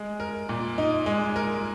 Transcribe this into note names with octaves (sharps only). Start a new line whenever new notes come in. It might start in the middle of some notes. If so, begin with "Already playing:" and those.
Already playing: G#3
A#4
A#2
D#4
G#3
A#4